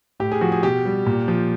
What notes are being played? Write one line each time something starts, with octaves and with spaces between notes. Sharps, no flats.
A2 G4
G#4
F3 F#4
G#4
B2 G4
G3
A#2
F3